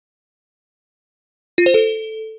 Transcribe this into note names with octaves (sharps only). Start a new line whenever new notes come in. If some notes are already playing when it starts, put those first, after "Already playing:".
F4
C5
A4